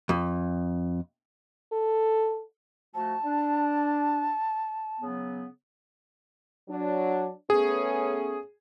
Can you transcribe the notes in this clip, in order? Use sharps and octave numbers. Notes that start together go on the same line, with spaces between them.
F2
A4
F3 A3 F#4 A5
D4
C#3 F#3 B3
F#3 D4
A3 B3 C#4 G#4